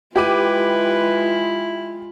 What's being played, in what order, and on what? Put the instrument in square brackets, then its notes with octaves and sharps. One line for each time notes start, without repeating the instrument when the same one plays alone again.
[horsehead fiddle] G#3 F4 [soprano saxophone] E4 [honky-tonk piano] G4 D6 D#7 [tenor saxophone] B4